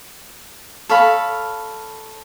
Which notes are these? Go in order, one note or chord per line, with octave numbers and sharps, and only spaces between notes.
A4 C#5 F5 B5